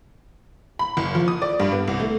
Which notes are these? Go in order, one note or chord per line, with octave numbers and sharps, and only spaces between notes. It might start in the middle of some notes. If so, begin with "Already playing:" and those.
B5
F#1
F3
D#6
D5
G2
B3
C2
A3